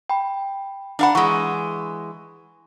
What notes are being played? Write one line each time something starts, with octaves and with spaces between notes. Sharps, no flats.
G5 B5
D4 F5 F#5 A#5 B5
E3 G#3 C#6